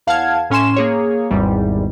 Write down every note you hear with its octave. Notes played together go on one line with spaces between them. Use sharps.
E2 F5 F#5 A5 F6 G#6
A2 C#4 G#5 C6 E7
A#3 G#4 C#5
G#1 E2 G#2 G3